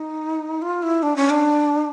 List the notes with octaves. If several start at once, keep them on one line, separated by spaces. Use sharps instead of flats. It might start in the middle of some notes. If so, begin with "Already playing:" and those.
Already playing: D#4
F4
E4
D4
C#4
D4